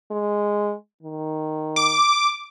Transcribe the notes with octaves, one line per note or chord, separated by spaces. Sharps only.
G#3
D#3
D6